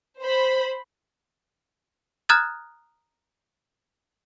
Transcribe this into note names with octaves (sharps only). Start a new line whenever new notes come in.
C5 B5
A#5 D#6 F6 F#6 G#6 A6